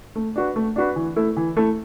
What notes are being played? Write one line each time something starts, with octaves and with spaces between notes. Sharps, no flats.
A3
D4 F#4 B4
A3
D4 F#4 B4
E3
A3 E4 A4
E3
A3 E4 A4